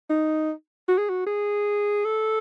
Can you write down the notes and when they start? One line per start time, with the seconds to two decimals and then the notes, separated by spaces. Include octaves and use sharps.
0.10 D#4
0.88 F#4
0.98 G#4
1.09 F#4
1.27 G#4
2.05 A4